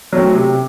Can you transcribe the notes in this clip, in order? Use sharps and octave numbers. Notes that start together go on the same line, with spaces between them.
F#3 A3 C4
C3